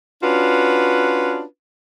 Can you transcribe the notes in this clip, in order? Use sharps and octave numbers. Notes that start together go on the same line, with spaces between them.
C#4 D4 F4 F#4 B4